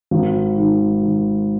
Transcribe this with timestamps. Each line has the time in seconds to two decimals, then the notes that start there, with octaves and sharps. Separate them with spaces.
0.11 G#1
0.58 D#3
1.03 D#3